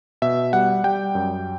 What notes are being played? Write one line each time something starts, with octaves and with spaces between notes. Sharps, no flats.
B2 E5
G3 F#5
G3 G5
F#2